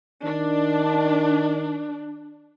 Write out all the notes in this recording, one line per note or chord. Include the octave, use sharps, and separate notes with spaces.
D#3 D4